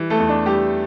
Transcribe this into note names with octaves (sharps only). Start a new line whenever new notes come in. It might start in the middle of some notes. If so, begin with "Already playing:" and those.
Already playing: E3 G3
A3 A4
E2
D4
G3 G4